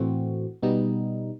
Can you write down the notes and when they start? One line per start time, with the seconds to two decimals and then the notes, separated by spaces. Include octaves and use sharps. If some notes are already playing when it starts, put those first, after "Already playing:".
Already playing: A2 E3 A3 C4 F#4
0.63 B2 G3 B3 D#4